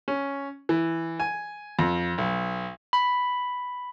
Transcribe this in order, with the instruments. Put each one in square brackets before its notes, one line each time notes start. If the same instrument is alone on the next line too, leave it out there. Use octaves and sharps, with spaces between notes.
[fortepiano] C#4
E3
G#5
F2
B1
[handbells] B5